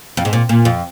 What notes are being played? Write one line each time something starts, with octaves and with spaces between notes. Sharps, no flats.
F2
G#2
A#2
A#2
F2